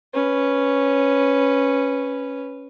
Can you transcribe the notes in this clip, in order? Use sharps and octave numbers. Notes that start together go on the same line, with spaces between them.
C#4 B4